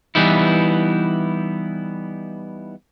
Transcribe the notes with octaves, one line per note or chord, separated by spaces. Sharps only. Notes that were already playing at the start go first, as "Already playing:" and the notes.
E3 G3 B3 D#4 E4